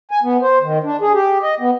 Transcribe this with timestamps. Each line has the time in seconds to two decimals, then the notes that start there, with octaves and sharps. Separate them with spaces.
0.11 G#5
0.23 B3
0.42 C5
0.62 D#3
0.84 D4
1.01 G#4
1.13 G4
1.43 D#5
1.60 B3